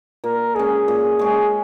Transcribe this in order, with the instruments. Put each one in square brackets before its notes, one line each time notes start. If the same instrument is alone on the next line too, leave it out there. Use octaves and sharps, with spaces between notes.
[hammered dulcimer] A#2 [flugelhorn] A#4
[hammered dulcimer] G#3 C#4 [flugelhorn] G#4
[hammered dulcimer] A#2
G#3 C#4